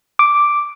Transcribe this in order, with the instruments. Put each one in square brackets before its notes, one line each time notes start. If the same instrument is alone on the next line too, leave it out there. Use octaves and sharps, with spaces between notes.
[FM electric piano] D6